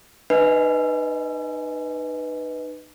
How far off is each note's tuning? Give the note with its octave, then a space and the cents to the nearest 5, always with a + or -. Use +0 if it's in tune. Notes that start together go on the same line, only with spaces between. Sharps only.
D#4 -30 B4 +0 D#5 +30